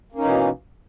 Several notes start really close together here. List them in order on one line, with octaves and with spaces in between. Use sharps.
A#3 C#4 D#4 E3 B2